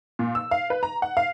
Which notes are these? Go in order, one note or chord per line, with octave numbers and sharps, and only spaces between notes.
A#2
E6
F5
B4
A#5
F#5
F5